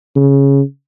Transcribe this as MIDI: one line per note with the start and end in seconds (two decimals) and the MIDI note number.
0.16 0.61 49